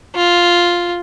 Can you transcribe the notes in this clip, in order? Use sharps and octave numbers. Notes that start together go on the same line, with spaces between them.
F4